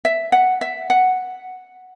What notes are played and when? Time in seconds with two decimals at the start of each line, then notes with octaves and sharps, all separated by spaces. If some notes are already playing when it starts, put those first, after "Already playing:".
0.05 E5
0.32 F#5
0.61 E5
0.90 F#5